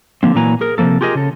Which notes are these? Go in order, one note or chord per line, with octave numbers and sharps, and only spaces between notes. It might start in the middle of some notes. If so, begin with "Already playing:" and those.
D3 F3 A#3 C4
A#2 E3 F#3 A#3 G#5 A#5
G#4 A#4
C3 E3 F3 A#3 A4
F4 G4 G#4 A#4 D#5
C#3 A4